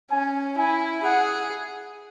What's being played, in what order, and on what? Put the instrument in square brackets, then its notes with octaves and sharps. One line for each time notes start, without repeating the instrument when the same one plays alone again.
[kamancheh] C#4 [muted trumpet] G#5
[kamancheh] E4 [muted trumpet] G#5
[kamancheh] G#4 [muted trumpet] F#5